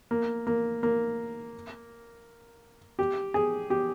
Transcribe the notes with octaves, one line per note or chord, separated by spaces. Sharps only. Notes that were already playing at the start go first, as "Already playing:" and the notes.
A#3
A#3
A#3
G4
G#4
G4